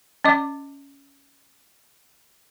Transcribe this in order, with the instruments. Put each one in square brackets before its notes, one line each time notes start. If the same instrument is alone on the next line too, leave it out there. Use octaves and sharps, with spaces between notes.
[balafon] C#4 D#5 D6